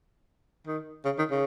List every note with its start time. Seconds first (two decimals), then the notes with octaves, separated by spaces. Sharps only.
0.67 D#3
1.05 C#3
1.18 D#3
1.31 C#3